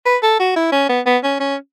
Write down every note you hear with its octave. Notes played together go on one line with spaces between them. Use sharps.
B4
A4
F#4
E4
C#4
B3
B3
C#4
C#4